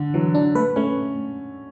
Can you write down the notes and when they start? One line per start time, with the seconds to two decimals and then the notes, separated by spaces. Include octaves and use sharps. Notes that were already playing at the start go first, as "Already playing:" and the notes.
Already playing: D3
0.14 E3 F#3
0.35 D4
0.55 A3 B4
0.76 A3 C#4